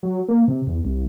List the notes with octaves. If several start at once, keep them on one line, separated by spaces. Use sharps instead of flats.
F#3
A#3
C3
E2
C2